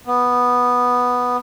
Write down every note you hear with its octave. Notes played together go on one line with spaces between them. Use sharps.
B3